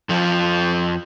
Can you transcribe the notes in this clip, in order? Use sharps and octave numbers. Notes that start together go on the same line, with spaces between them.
F2 F3